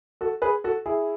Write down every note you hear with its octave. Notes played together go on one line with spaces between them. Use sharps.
F#4 A4
G#4 B4
F#4 A4
E4 G#4